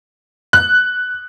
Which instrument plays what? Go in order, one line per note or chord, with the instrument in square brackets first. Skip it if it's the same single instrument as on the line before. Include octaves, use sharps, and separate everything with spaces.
[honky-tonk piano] F#6